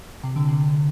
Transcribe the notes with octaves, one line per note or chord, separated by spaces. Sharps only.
C3
D3
C3